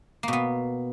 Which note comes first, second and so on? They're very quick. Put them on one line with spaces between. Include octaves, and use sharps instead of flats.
A#3 B2 B3